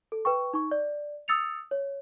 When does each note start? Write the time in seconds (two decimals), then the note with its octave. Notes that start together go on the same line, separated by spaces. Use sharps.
0.12 A4
0.25 B4 G5 C#6
0.53 D#4 C#6
0.71 D5
1.28 D#6 E6 A6 C#7 F7
1.71 C#5